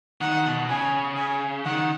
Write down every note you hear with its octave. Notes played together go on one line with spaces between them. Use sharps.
D#3 F#5
B2
C#3 G#5
G#5
D#3 F#5